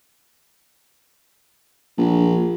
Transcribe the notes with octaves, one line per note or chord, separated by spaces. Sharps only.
A#1